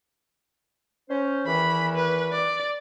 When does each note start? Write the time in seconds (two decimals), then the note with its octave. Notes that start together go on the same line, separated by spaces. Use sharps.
1.09 C#4 C5
1.46 E2 D#3 E3 B5
1.95 B4
2.32 D5